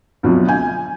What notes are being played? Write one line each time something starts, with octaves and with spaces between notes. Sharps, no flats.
D2 B2 F3 F#3
G#5 G6